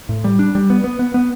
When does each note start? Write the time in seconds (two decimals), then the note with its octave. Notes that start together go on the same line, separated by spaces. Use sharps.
0.09 A2
0.24 G3
0.39 D4
0.55 G3
0.70 B3
0.84 B3
0.99 B3
1.14 B3